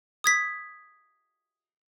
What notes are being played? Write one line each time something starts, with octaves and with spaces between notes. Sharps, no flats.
D#6 G#6 B6